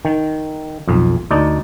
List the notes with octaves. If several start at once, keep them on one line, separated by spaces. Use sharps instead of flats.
D#3
B1 F2
D2 D#4 D5 A5